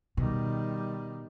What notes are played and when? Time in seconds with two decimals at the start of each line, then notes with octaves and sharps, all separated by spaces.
0.17 B2 D#3 G3